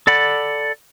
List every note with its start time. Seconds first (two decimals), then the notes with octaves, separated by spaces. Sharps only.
0.07 A4 D5 F#5 B5